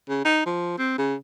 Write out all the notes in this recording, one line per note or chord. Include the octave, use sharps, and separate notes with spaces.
C#3
D#4
F3
C4
C#3